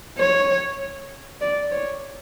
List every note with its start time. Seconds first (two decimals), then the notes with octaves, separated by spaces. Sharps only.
0.18 C#5
1.41 D5
1.72 C#5